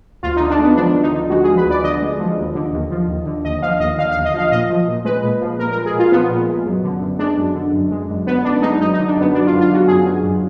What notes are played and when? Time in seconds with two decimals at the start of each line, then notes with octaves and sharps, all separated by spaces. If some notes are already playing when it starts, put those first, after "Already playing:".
0.23 D2 F4
0.36 D3 D#4
0.50 D4
0.58 G#3 B3
0.76 F3 D4
0.94 D2
1.03 D#4
1.12 D3
1.30 G#3 F#4
1.44 F3 G#4
1.57 B4
1.66 D2 D5
1.84 D3 D#5
2.02 G#3
2.19 F3
2.37 D#2
2.55 D3
2.73 D#2
2.91 F3
3.08 D#2
3.26 D3
3.45 D#2 D#5
3.62 F3 F5
3.80 D#2 D#5
3.98 D3 F5
4.11 F5
4.16 D#2
4.25 D#5
4.34 F3 F5
4.51 A#2 D#5
4.70 F3
4.88 A#2
5.05 G#3 B4
5.23 A#2
5.41 F3
5.59 A#2 A#4
5.72 G#3 A#4
5.86 G#4
5.94 A#2
5.99 F4
6.12 F3 B3
6.30 A#2
6.48 G#3
6.66 F#2
6.84 D3
7.01 F#2
7.19 G#3 D4
7.37 F#2
7.55 D3
7.73 F#2
7.91 G#3
8.09 F#2
8.26 D3 B3
8.44 F#2 D4
8.62 G#3 D#4
8.80 F#2 D#4
8.94 D#4
8.99 D3
9.07 D4
9.16 F#2 B3
9.34 F#3 D4
9.47 F4
9.52 F#2
9.61 F4
9.70 D3 F#4
9.88 F#2 G#4
10.05 F#3
10.23 F#2